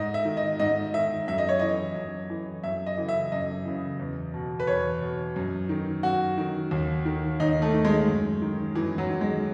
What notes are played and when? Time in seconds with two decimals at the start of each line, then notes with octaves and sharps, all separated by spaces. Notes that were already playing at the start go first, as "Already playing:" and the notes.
Already playing: G#2 D#5
0.14 E5
0.25 D#3
0.37 D#5
0.60 G#2 D#5
0.94 D#3 E5
1.28 F#2 E5
1.38 D#5
1.49 C#5
1.59 E3 D#5
1.96 F#2
2.30 E3
2.63 F#2 E5
2.86 D#5
2.97 C#3 E3
3.09 E5
3.32 F#2 D#5
3.65 C#3 E3
3.99 E2
4.34 B2
4.60 B4
4.67 E2 C#5
5.01 B2
5.36 F#2
5.69 D#3
6.03 F#2 F#4
6.38 D#3
6.71 D#2
7.05 D#3
7.40 D#2 D#4
7.62 A3
7.73 D#3
7.85 G#3
8.07 F#2
8.42 D#3
8.75 F#2 E3
8.98 F#3
9.10 D#3
9.21 G#3